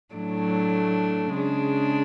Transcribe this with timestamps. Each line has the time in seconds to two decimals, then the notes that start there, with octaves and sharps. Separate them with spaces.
0.14 A2 F#3 A3 D4
1.34 C#3 G#3 D4